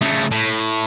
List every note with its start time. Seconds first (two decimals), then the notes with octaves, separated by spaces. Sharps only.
0.02 C#3 A3
0.31 A2